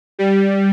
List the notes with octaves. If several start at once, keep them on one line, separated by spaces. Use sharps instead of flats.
G3